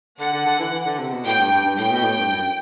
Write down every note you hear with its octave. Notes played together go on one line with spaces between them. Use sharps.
D3 F#5
D3
D3
E3
E3
D3
C3
B2
A2 G5
G2
G2
G2
A2 G5
B2
A2
G2
F#2